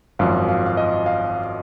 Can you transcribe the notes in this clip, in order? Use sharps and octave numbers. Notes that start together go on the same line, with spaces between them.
G#1 F#2 F3 F5
F5
F5
D#5
F5